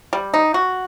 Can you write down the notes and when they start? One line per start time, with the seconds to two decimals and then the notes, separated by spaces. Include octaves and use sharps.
0.13 G3
0.34 D#4
0.54 F#4